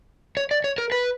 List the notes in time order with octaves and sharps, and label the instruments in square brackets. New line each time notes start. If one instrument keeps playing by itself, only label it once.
[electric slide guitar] C#5
D5
C#5
A#4
B4